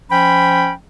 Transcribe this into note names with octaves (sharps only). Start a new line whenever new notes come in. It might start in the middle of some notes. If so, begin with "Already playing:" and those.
F3 C#4 G5 B5